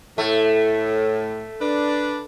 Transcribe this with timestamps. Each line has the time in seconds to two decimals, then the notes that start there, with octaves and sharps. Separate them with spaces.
0.18 A2 A3
1.61 D4 B4